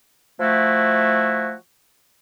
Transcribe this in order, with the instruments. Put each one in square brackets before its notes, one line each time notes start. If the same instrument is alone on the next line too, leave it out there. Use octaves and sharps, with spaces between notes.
[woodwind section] F3 A3 E4 F#4